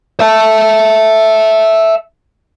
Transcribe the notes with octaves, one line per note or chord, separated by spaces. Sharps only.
E5 A5